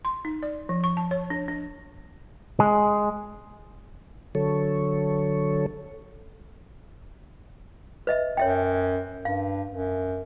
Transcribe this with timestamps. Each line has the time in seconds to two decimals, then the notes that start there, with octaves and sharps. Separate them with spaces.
0.05 C6
0.25 D#4
0.43 D5
0.69 F3
0.84 C#6
0.97 A5
1.11 C#5
1.30 D4
1.48 D4
2.60 G#3
4.35 D3 F#3 A4 C#5
8.07 B4 D#5 E5
8.37 F#2 C#5 E5 G5
9.25 G2 F5
9.71 F#2